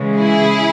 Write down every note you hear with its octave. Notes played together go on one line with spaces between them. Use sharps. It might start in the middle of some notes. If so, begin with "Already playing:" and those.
Already playing: C#3 E3 G#3
E4 G#4